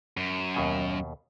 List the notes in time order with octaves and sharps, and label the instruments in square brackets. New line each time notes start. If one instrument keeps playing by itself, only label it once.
[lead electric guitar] F#2
[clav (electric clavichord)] D#2 B2 G#5